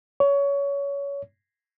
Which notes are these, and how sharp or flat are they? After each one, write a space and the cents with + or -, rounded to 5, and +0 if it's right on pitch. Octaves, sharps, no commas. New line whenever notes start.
C#5 +20